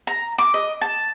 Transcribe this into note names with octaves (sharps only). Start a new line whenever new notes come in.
A#5
D6
D#5
A5